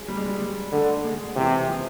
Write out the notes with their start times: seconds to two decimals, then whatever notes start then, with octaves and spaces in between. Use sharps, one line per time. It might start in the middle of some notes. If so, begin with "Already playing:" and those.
Already playing: F#3 G#3
0.08 G3
0.17 G#3
0.26 G3
0.40 G3
0.72 D3 A3
1.04 G#3
1.36 C3 E3
1.68 F3